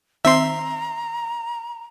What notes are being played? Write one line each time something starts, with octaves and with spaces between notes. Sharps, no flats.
D#3 C4 E5 A#5 C6